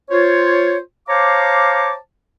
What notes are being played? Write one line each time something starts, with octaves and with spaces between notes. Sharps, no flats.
F4 C5 C#5
C5 C#5 F5 A5 A#5 D6